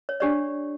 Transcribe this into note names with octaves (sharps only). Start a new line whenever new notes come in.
C#5
D4 G4 C#5 D5